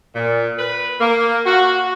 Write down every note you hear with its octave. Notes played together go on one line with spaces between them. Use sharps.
A#2
B4
A#3
F#4